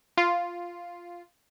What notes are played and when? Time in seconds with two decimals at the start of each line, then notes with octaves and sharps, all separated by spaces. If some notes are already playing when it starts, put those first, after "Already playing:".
0.17 F4